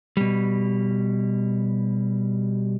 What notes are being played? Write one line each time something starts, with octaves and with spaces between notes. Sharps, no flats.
B2 G3